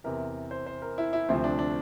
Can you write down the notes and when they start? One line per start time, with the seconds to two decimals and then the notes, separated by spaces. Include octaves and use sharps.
0.04 E2 C3 E3 A#4
0.51 C5
0.66 C5
0.82 A#4
0.98 E4
1.13 E4
1.29 D2 C3 F3 A3 C4
1.44 D4
1.59 D4